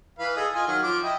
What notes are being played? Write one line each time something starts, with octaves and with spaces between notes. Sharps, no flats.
E3 B4 F5
G#4 A4 D#5
F4 D#5 G#5
D#3 F#3 F6
F3 D6
E4 D#5 G5